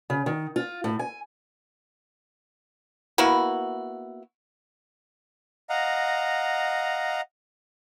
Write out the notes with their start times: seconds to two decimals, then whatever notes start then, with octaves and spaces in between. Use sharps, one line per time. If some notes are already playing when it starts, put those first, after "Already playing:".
0.10 C#3
0.26 D#3
0.56 F4
0.84 A2
0.99 G#5
3.18 A#3 B3 E4 F#4
5.70 D#5 F5 F#5 A#5